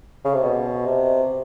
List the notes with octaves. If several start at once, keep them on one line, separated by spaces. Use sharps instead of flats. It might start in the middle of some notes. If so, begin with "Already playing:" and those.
C#3
C3
B2
C3